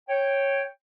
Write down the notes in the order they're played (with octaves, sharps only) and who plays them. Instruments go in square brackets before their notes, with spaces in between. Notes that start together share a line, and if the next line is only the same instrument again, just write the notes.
[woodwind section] C#5 G5